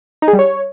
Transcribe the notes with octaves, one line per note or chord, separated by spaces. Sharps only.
D#4
G#4
G3
C#5